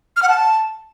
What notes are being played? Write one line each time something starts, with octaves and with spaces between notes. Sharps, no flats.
F6
F#5
A5